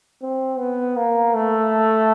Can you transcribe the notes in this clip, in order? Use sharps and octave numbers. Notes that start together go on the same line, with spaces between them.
C4
B3
A#3
A3